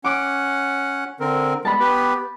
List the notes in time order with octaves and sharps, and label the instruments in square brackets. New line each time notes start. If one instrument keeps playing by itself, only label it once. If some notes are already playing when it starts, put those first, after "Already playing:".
[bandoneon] C#4 F#5 [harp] D6
[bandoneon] D3 C4 A#4
[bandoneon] G3 G#3 B3 [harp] A5 B5
[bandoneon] B3 G4 B4